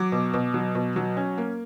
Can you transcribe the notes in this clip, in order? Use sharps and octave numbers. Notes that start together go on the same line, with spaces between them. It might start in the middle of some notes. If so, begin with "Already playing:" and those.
Already playing: F#3 D6
B2
B2
F#3
B2
F#3
C#4
A#3